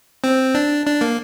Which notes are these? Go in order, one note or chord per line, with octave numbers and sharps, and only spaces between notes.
C4
D4
D4
A#3